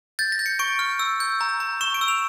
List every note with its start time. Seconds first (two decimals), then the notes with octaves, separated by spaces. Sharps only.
0.19 G6 A6
0.32 A#6
0.39 G6
0.46 C#7
0.59 C#6 D7
0.79 F6
0.99 E6
1.20 G6
1.41 A#5
1.60 A#5
1.81 C#6 E7
1.94 D7
2.01 E6
2.08 F7